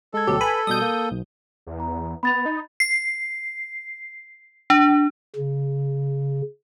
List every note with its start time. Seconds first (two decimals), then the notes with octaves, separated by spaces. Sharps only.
0.14 G#3 A4 G#6
0.27 D2 B2 F#3 G4
0.41 B4 G#5 B5
0.67 B2 G3 D#6 G6
0.82 A#3
1.11 B1
1.67 E2
1.80 A#5
2.23 B3 B5 A6 F7
2.45 D#4
2.80 C7
4.70 D4
5.36 C#3